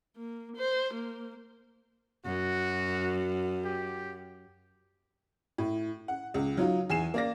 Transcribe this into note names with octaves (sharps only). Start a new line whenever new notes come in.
A#3
C5
A#3
F#2 F#4
G4
A2
F#5
C#2
F#3 D#4 F4
E2 G#5 C7 E7
A#3 D5 A#6